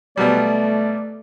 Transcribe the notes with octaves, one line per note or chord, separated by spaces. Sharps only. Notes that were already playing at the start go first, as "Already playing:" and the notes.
B2 F#3 G3 A3 D5